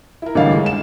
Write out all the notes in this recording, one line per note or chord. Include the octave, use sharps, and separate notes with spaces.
E4 A#4
A1 D3 E3 G3 D#5 F5
G#3
E7